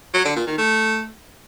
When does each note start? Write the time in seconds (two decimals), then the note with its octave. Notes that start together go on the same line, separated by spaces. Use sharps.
0.14 F#3
0.25 D3
0.36 A#2
0.47 D#3
0.58 A3